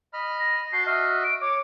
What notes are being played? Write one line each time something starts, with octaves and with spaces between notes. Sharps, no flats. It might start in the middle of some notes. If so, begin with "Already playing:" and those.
D#5 B5 F6
A#6
F#4 A5 G6 C7
F#4 D#5 E5 F6
D7
C#5 D6